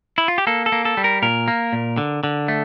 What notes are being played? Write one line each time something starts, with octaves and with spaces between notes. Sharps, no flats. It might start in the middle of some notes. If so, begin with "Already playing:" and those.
E4
F4
G4
A#3 A4
A4
A#3
A4
G3
A#4
A#2 A#4
A#3
A#2
D3
D3
A3